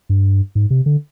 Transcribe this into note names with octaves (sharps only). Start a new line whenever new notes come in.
G2
G#2
C3
D3